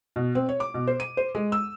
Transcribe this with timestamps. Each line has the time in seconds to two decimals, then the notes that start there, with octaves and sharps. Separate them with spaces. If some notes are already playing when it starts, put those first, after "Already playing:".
0.16 B2
0.35 C4
0.49 C#5
0.60 D6
0.74 B2
0.87 C5
1.00 D#7
1.17 C5
1.35 G#3
1.52 E6